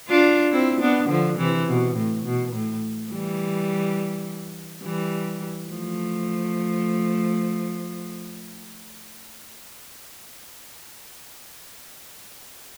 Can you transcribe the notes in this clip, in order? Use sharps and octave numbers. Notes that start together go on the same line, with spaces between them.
D4 F4
C4 E4
B3 D4
D3 F3
C3 E3
B2
A2
B2
A2
E3 G3
E3 G3
F3 A3